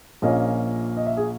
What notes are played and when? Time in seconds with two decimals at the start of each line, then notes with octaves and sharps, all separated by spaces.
0.22 A#1 A#2 A#3 C#4 D#5
0.97 D#5
1.06 E5
1.17 G#4